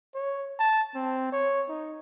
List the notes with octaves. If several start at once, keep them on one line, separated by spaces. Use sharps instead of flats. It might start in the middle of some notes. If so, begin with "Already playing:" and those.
C#5
A5
C4
C#5
D#4